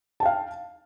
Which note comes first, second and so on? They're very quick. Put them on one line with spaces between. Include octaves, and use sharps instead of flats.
A5 G5 F5